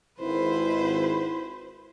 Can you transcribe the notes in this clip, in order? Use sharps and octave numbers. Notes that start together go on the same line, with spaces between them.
G#1 E4 B4 C5